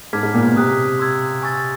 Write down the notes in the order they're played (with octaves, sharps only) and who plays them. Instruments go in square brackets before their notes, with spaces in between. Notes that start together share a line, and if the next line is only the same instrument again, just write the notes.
[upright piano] G#2 [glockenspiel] A5 D6 F6 G#6 B6
[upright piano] G#2
A#2
B2
[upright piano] C3 [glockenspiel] D#6 F#6 B6
[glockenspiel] C6 E6 G#6
G#5 C#6 E6 A6